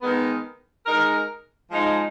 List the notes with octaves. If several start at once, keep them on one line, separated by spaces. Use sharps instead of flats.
D#3 G#3 B3
G#3 D#4 A#4
F3 G#3 D#4